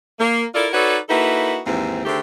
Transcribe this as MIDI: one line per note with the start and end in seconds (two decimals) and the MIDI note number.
0.19 0.43 58
0.54 0.67 64
0.54 0.67 65
0.54 0.67 69
0.54 0.67 70
0.54 0.67 74
0.73 0.98 63
0.73 0.98 66
0.73 0.98 69
0.73 0.98 71
0.73 0.98 73
0.73 0.98 74
1.09 1.60 58
1.09 1.60 63
1.09 1.60 64
1.09 1.60 66
1.09 1.60 69
1.09 1.60 71
1.66 2.05 39
1.66 2.05 44
1.66 2.05 52
1.66 2.05 60
2.05 2.19 50
2.05 2.19 51
2.05 2.19 57
2.05 2.19 60
2.05 2.19 67
2.05 2.19 68